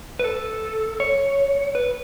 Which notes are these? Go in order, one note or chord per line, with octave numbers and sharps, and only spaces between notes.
B4
A4
C#5
B4